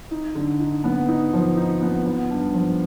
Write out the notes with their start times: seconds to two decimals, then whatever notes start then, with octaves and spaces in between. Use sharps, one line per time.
0.11 D#4
0.35 D3
0.60 D#4
0.84 B3
1.08 D#4
1.33 F3
1.57 D#4
1.82 B3
2.06 B3
2.30 G2
2.54 F3